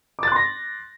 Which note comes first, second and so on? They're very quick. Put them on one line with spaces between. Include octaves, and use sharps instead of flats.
D6 A6 F#6 C6 A#6